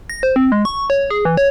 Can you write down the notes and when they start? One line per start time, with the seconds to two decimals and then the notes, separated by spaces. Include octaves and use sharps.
0.10 A#6
0.23 C5
0.36 C4
0.52 G#3
0.65 C#6
0.90 C#5
1.11 G#4
1.25 E3
1.37 C#5